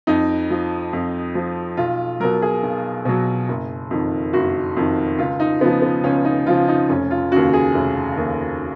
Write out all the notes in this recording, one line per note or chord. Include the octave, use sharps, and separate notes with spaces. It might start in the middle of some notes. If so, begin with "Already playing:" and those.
F2 D#4
F3
F2
F3
B1 F4
B2 F#3 A#4
G#4
B1
B2 F#3
F#1
F2 D#3
F#1 F#4
F2 D#3
C#2 F4
D#4
C#3 F3 B3
B3
C#2 C#4
D#4
C#3 F3 F4
D#4
F1 C#4
F4
D#2 C#3 F#4
G#4
F1
D#2 C#3